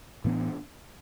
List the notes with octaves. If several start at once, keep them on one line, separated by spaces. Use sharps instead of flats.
A2 E3 B3 D4